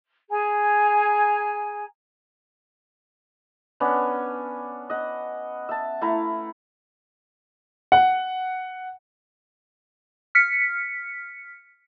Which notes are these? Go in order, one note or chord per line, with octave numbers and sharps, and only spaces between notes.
G#4 G#5 A#5
B3 C#4 D4
D#5 F#5
E5 A5
A3 E4 F5 A#5
F#5
F6 B6 C#7